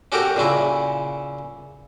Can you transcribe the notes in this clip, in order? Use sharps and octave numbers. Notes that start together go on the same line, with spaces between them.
C#4 F#4 G4 A4 A#4
A#2 C#3 C#4 E4